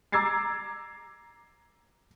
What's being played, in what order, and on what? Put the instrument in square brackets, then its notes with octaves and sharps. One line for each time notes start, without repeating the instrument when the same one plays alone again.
[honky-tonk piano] A#5 D6 E6 G#6 A6 C7